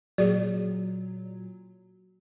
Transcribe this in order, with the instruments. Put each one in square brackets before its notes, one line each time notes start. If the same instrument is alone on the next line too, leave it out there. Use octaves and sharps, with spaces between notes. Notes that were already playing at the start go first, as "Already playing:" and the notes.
[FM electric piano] A#2 F#3 [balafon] G#4 D5